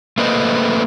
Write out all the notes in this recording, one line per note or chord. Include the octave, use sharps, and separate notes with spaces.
A3 A#3 B4 C5 D#5